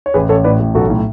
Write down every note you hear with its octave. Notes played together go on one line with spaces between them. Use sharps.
C#5
A1 G#4 B4
A1 A4 C#5
A2 B4 D5
A1
B1 F#4 A4
A2